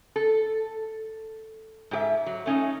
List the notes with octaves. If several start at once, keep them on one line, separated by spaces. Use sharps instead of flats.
A4
G#2 G4 E5
F#3
A3 C#4 D#4